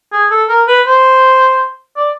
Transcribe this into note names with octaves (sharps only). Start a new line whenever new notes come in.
G#4
A4
A#4
B4
C5
D5